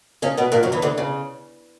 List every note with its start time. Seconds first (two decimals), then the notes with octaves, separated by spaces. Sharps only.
0.22 C#3 C#4
0.37 B2 B3
0.52 A#2 A#3
0.63 F#2 F#3
0.72 E2 E3
0.82 D2 D3
0.98 C#3